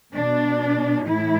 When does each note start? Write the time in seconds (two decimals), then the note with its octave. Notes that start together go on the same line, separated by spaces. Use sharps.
0.15 B2 D4
1.08 A2 E3 E4